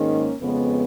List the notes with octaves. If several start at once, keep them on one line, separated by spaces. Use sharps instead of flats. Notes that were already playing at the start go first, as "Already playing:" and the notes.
Already playing: G#2 D#3 G#3 A#3 C#4
F2 C#3 G#3 B3